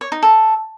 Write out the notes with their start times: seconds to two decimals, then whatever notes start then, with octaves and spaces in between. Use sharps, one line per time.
0.01 C#5
0.12 D#4
0.23 A4